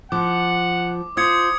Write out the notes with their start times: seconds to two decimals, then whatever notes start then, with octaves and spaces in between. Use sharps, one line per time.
0.12 F3 F#5 D6
1.17 F4 C5 D#6 G#6 C#7